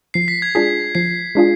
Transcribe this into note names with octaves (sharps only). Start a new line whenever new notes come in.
F3 C7
B6
G#6
G#3 D4 F4 G#4 B6
F3 C7
G#3 D4 F4 G#4